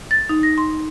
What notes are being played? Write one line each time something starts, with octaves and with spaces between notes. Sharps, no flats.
A6
D#4
A#6
C6